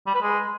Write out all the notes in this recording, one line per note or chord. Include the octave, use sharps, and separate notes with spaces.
G3
B4
G#3